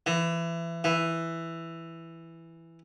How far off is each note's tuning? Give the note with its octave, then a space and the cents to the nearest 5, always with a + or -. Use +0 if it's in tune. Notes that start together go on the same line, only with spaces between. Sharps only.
E3 +25
E3 +5